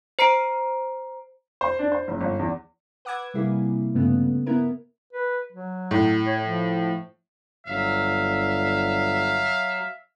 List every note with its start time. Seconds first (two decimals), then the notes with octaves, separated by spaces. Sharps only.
0.19 C5 A#5 C7 D7
1.61 C5
1.79 D4
1.92 C5
2.08 F#1
2.21 G1
2.39 E2
3.05 B4 F#5 D6 E6 G#6
3.34 C3 G3 A#3 E4 G#4
3.95 G2 C#3 A3 B3
4.46 B3 E4 A#4
5.13 B4
5.53 F#3
5.91 A2
6.26 C#5
6.42 F3
7.67 G1 F#3 E5 F5